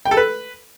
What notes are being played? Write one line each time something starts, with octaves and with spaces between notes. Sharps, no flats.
G5
A4
B4